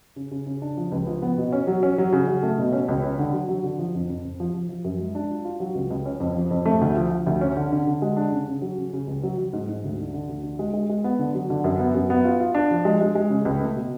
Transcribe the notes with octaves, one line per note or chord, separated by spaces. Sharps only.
C#3
C#3
C#3
D4
F3
C#2
F3
B3
B2
C#4
F#3
C#4
F#3
C#3
F#3
A3
B2
C#4
C#2
C#4
D3
F#3
F#3
D3
F3
F2
F2
F2
F3
F3
F3
F#2
G#3
D4
F4
F4
F#3
C#2
C#2
C#4
F2
F3
F2
A3
D2
F3
F3
D2
C#4
D3
D3
D3
G#3
D4
C#3
C#3
F#3
C#3
C#3
C#2
F#3
F#3
G#2
G#2
D2
D3
D3
D2
D3
G#3
G#3
G#3
B3
D3
F#3
D3
F#2
B3
F#2
B3
F4
F4
D4
F3
G#3
G#3
G#3
C#3
C#2
A3
B2